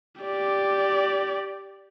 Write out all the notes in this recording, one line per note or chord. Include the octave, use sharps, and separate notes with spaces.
G4 D5